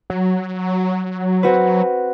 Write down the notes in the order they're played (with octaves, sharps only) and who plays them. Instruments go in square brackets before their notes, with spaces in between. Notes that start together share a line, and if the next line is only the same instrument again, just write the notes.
[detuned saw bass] F#3
[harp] C4 F#4 B4